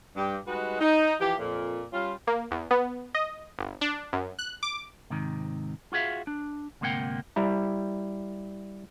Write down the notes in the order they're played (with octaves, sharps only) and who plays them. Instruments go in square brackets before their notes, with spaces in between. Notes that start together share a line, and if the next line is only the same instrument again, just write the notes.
[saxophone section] G2 G4
G3 G#3 D#4 F#4 B4
D#4
E3 F3 G4
F2 A#2
G3 C#4 F4
[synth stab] A#3
E2
B3
D#5
G1
D4
F#2
F#6
D6
[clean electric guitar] G#2 C3 D#3
F4 F#4 G#4 E5 F5
D4
D2 G#2 C3 A#3 F#5 G5
[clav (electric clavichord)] G3 E4 A#5